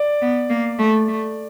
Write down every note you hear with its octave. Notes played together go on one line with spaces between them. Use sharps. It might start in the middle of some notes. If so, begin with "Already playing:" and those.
Already playing: D5
B3
A#3
A3
A3